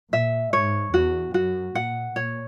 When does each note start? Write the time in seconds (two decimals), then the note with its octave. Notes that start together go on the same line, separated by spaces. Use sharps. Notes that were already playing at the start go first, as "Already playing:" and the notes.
0.13 A#2 E5
0.53 G#2 C#5
0.94 E2 F#4
1.34 F#2 F#4
1.75 A#2 F#5
2.16 A#2 C#5